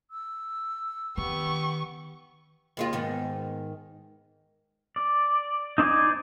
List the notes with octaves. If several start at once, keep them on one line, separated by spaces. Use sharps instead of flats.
E6
D#3 B3 G4 C#6
D#2 G#3 F4
G#2 D#3 B3
D5
D#4 C5 D5 D#5 G#5